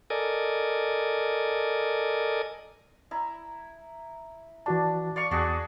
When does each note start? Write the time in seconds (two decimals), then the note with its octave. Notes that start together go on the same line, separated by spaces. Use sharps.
0.10 A4 A#4 D5 D#5 G#5
3.11 E4 A#5
4.66 E3 D4 F#4 A5
5.16 D5 F5 C#6
5.31 E2 D4 F#4 G#4